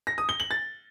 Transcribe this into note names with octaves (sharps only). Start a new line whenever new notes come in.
A#6
D#6
G7
F#7
A6